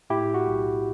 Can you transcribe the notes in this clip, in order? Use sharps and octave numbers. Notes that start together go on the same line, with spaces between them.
A2 E4 G4
F#4
B1